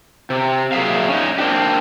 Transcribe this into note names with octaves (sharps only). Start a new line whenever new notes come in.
C3
A#2 F#3 G#4 E5 F5
C#4 D#4
A#3 C4 D4 F#4 G4